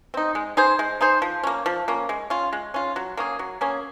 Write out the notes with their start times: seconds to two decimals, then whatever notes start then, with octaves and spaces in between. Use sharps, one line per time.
0.14 C4 D#4
0.35 G#3
0.57 D#4 G#4 C5
0.79 G#3
1.01 D#4 G#4 C5
1.22 F3
1.43 A#3 C#4
1.66 F3
1.88 A#3 C#4
2.09 G#3
2.30 C#4 F4
2.53 G#3
2.74 C#4 F4
2.96 F#3
3.17 A#3 C#4 G#4
3.39 F#3
3.61 A#3 C#4 G#4